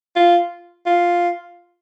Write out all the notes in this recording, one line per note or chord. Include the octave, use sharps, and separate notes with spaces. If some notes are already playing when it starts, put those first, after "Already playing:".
F4
F4